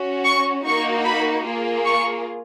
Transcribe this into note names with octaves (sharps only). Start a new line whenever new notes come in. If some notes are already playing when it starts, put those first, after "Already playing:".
Already playing: C#4 F#4
C#6
A#3 D#4 F#4 C#6
B5
A#3 F4 G#4
C#6